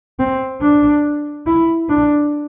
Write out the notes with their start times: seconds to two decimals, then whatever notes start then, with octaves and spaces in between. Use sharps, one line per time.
0.19 C4
0.62 D4
1.46 E4
1.89 D4